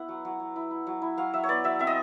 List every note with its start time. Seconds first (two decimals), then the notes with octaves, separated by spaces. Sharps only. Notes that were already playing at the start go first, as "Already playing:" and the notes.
Already playing: B3 E4 F#5
0.09 F#3
0.25 F#3
0.40 F#3
0.56 E4
0.71 E4
0.87 F#3
1.02 E4
1.17 F#3 F5
1.33 F#3 E5
1.44 C#5
1.49 B3 D5
1.64 F#3 E5
1.79 C4 E5
1.87 D#5